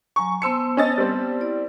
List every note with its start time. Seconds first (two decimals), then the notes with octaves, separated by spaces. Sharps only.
0.16 F#3 G#5 A#5 C#6
0.42 B3 C5 A5 C6 E6 C#7
0.77 C#4 D#5 A6
0.98 G3 C4
1.40 E4 D5